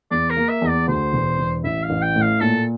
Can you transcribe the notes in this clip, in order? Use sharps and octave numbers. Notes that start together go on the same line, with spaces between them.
E2 D5
A#4
A#3
E5
E2
D5
D2 C5
E1
E1
A1 E5
F5
A1
G5
A2
F5
A#2 A4